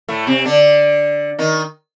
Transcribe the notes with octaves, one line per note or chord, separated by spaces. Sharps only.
A2 A3
C3 C4
D3 D4
D#3 D#4